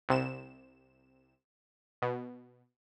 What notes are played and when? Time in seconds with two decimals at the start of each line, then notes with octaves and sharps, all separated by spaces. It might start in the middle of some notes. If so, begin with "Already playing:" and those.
0.09 C2 C3 E7
2.02 B2